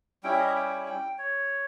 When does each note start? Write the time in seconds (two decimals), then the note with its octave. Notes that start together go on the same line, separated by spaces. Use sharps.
0.24 G3 C#4 E4 G5
0.32 E5
0.39 D#5
0.47 E5
0.56 G5
0.86 G5
1.18 C#5